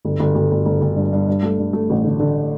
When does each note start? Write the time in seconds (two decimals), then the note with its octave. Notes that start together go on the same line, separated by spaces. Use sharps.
0.05 G1
0.19 G1
0.35 G1
0.51 G1
0.65 G1
0.81 G1
0.96 G2
1.13 G2
1.28 G2
1.43 A3
1.59 G2
1.73 A3
1.90 A1
2.05 D3
2.20 D3